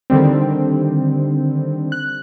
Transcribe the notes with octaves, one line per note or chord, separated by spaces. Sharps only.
D3 D#3 G3 C4
F#6